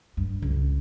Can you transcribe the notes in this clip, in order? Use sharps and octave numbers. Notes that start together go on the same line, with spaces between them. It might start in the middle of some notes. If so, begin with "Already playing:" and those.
G2
C#2